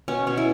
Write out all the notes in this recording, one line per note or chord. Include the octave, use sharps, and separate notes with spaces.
B2 C#4
B2 C#4
E4